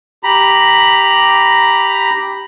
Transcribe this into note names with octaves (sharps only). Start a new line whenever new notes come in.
G4 A#5 B5